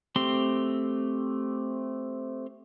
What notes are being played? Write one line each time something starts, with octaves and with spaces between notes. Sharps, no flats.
A3 C4 G4 C6